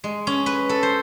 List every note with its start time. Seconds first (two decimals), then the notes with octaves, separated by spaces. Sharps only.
0.04 G#3
0.27 C#4
0.46 B4
0.69 A4
0.83 C5